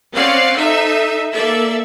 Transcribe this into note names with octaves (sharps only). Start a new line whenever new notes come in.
C4 C#4 D5 F5 F#5
D#4 A4 E5
A#3 A4 D5 E5